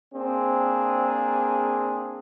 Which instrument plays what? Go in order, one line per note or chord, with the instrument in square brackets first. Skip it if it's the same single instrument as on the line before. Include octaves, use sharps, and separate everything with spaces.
[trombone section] A#3 C4 D4 G#4